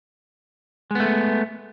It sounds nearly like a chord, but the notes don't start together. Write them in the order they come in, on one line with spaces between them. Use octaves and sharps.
G#3 B3 A3